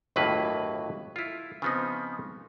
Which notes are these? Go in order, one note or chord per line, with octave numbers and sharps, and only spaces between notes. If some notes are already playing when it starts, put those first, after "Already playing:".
G1 D#2 A2 F#3 A#3 B4
E4 F4
C#3 F3 B3 C4 D#4